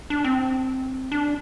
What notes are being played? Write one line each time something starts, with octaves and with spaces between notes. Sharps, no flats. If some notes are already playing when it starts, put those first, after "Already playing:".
D4
C4
D4